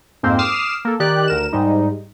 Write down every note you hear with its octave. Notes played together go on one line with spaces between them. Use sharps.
F2 G#2 A#3 C4 C5
D6 D#6 F6 C7 E7
A#3 A4
D#3 G4 D5 F#6
D2 A#4 E7
G#2 G3 D#4